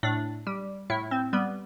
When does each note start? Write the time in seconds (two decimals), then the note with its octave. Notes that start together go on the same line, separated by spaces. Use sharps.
0.03 A2 D4
0.47 G3
0.90 A2 E4
1.11 C4
1.33 G3 B3